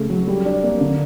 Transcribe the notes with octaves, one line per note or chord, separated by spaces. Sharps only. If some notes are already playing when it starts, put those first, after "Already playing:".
Already playing: C#3 A3
F#3
G3
D4
A#3
D3